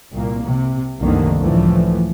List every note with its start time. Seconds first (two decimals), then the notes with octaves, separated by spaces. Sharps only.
0.12 C2 A#2 A#3
0.43 C3
1.00 F1 C2 F#2 D3 D#3 A#3
1.38 C#2 A2 D3 E3 F3 A3